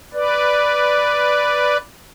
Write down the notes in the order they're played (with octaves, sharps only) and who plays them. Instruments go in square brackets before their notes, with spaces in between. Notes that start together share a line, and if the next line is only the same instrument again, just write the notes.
[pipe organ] B4 D5